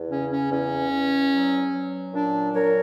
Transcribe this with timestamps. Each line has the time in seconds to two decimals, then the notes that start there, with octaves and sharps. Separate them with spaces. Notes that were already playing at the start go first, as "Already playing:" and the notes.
Already playing: E2
0.09 C#3 C#4
0.30 C#4
0.50 E2 C#4
0.91 E2
1.32 F#3
1.72 F#3
2.12 A#2 D4
2.53 F#3 A#4 C#5